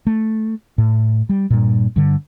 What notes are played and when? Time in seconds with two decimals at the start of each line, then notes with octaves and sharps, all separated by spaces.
0.07 A3
0.78 A2
1.29 G3
1.50 G2 A#2
1.96 G2 D3